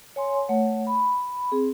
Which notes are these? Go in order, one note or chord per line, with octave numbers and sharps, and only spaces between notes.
C#5 G#5 C6
A3 C#5 F#5
B5
C4 G#4